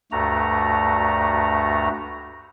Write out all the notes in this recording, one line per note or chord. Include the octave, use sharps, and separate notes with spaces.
D2 G2 A3 F#4 A#5